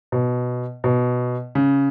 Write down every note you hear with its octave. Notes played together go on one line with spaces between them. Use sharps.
B2
B2
C#3